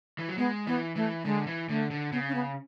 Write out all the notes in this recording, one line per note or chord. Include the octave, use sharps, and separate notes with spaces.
E3
F#3
G#3 B3
E3 B3
E3 A3
D3 G#3
E3
D3 A3
D3
C#3 B3
C#4
B3